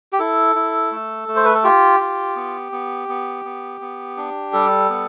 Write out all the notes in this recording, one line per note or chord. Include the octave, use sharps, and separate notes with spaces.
G4
E4 A4
E4
A3
A3
C5
B4
A4
F4 G4
F4
B3
B3
B3
B3
B3
D4
G3 A4
B3